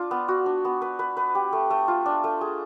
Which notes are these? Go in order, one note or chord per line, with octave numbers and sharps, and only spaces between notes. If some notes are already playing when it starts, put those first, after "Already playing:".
Already playing: D4 F4
B3
F#4
D4
B3
B4
B4
B4
G4
A3
A3
F4
D4
A3
G#4